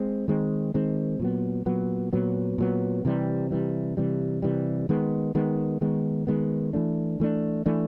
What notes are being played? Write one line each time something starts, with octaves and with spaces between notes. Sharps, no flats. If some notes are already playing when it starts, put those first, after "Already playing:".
Already playing: G#3 C4
D#3 G#3 C4
D#3 G#3 C4
A#2 F#3 B3
A#2 F#3 B3
A#2 F#3 B3
A#2 F#3 B3
C3 E3 G3
C3 E3 G3
C3 E3 G3
C3 E3 G3
D#3 G#3 B3
D#3 G#3 B3
D#3 G#3 B3
D#3 G#3 B3
E3 A3 D4
E3 A3 D4
E3 A3 D4